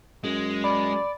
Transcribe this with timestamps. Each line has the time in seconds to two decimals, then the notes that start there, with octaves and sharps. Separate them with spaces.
0.24 F#2 G#3
0.64 D5 B5